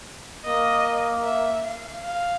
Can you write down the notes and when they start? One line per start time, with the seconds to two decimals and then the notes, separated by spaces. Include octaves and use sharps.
0.44 A#3 D#5
1.23 E5
1.64 F5
2.04 F5